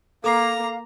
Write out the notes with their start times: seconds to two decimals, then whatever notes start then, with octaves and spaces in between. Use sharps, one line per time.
0.24 A#3 A4 F5 A#5 D6 C7